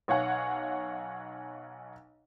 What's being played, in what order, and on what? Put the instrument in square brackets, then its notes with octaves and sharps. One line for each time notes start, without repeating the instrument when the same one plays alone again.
[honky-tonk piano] B1 C#5 F5 F#5 G#5